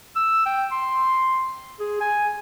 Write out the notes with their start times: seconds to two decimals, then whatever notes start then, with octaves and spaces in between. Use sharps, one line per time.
0.16 E6
0.46 G5
0.71 C6
1.80 G#4
2.01 G#5